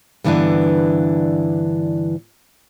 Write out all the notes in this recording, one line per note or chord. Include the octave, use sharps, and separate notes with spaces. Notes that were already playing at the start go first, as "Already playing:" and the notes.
G2 D3 E3 B3 D4